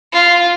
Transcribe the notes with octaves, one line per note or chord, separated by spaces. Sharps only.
F4